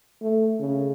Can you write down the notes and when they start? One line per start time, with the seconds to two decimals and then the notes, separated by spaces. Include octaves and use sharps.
0.22 A3
0.59 C#3